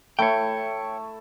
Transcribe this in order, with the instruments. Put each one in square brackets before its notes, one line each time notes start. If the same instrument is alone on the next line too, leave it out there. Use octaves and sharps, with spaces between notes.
[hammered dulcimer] A3 E4 [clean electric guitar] C#5 G5